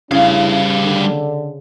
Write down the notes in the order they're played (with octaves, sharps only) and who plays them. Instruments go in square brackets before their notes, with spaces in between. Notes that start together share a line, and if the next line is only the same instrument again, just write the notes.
[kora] C#3 [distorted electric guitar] G3 F5 [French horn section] C#4 D4 E4
[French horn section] D3